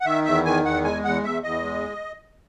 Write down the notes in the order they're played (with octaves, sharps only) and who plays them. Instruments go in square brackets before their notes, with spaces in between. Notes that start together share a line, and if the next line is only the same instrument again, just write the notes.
[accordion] F#5
D#3 E5
E2 E5
D#3 G#5
E2 F#5
G#3 G#5
E2 F#5
E2 E5
E2 D#5
G#3